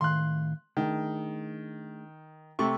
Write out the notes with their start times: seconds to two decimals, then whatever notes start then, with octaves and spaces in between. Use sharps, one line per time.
0.01 A2 D#3 F5 C6 F#6
0.77 D#3 A3 D4 G#4
2.59 C3 A3 C#6